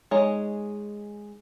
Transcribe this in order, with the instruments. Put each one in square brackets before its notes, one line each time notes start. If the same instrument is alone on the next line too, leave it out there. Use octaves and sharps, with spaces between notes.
[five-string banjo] G#3 D#4 G#4 C#5 A#5